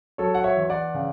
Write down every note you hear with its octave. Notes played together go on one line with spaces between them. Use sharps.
F#3 A4 C#5
F#5
C#5 E5
E2
D5 F#5
C#3